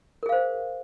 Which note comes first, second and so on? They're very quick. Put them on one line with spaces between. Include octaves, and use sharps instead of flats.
A#4 G#4 F5 C5